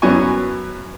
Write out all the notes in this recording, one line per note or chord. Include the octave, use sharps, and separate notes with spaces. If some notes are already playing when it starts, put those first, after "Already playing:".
F#2 F#3 B3 C#4 G#5 C#6